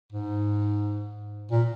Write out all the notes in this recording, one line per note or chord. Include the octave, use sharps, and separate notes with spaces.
G#2
A#2